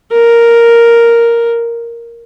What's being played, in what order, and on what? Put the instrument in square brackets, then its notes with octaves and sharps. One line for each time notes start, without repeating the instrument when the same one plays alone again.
[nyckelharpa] A#4